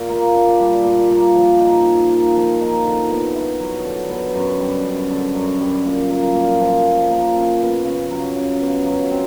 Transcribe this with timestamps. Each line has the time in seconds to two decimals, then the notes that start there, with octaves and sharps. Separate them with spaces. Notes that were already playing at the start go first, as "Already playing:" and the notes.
Already playing: A#2
0.09 A#3
0.35 D4
0.60 G3
0.85 A#2
1.09 A#3
1.35 F3
1.60 D#4
1.85 G#4
2.09 A#3
2.36 F3
2.61 D#4
2.84 D3
3.10 B3
3.35 E4
3.60 F#3
3.85 D3
4.10 B3
4.35 F#2
4.60 G3
4.85 F#2
5.11 D3
5.35 F#2
5.61 G3
5.86 A#2
6.10 A#3
6.35 A#2
6.61 F3
6.86 A#2
7.11 A#3
7.36 C#3
7.60 B3
7.85 C#3
8.10 F#3
8.36 C#3
8.60 B3
8.86 F#3
9.11 C4